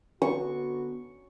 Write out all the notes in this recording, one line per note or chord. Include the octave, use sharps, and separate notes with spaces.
D3 B3 F#4 C#6